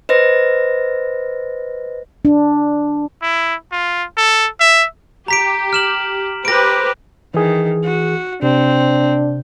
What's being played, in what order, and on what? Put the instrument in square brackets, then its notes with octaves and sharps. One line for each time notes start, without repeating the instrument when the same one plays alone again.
[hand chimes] B4 C5 D#5 A#6
[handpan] D4
[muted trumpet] E4
F4
A4
E5
[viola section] G4 [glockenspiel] A#5 B6 D7
[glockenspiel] F6 E7 F#7
[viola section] G4 B4 C5 [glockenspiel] A#6 D7
[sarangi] D#3 [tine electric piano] E3 G#4
[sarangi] F#4
[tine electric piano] C3 [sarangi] C4 [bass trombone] D4